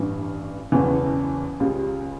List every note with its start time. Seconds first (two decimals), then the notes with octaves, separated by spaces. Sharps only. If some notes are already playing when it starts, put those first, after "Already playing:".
Already playing: A1 G2 E3
0.72 F#1 E2 C#3 E3
1.60 C#2 C#3 G3